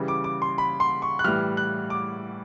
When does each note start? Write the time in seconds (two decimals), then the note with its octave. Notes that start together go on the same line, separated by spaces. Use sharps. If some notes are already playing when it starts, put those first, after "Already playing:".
Already playing: C#3 E3 G3
0.08 D6
0.24 D6
0.42 C6
0.58 B5
0.80 C6
1.02 C#6
1.19 F#6
1.24 A2 E3 G3 F6
1.57 F#6
1.90 D6